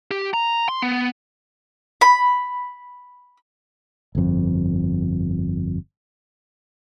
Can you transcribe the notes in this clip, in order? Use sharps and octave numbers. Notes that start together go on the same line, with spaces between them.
G4
A#5
C6
B3
B5
G1 F2